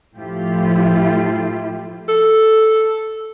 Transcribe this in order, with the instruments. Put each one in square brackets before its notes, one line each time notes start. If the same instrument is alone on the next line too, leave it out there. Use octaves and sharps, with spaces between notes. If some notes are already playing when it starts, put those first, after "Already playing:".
[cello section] A2 F3 A3 E4 F4 G4
[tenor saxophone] A4